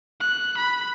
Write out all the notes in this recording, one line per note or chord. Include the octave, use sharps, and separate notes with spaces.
F#6
B5